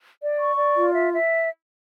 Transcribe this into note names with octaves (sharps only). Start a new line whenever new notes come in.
D5
C#6
D5
F4
E5
E5